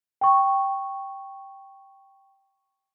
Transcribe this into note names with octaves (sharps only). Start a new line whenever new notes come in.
G5 C#6